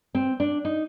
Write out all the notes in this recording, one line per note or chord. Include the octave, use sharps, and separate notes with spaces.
C4
D4
D#4